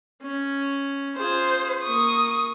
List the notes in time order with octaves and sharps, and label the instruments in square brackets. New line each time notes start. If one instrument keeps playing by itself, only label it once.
[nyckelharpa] C#4
[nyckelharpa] F4 G#4 [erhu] C5
[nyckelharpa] A#3 C#6 [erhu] D#6